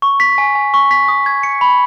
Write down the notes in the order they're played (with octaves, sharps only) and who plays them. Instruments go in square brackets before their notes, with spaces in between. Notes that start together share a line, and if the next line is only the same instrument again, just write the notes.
[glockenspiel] C#6
B6
G#5
G#5
C#6
B6
D#6
G#6
C#7
B5